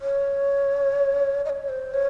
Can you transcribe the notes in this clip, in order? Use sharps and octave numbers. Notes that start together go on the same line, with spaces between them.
C#5
D#5
C#5
C5
C#5